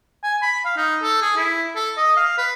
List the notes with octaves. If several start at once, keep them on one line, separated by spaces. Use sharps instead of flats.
G#5
B5
F5
D#4
A4
G#4
E4
A4
D#5
F5
B4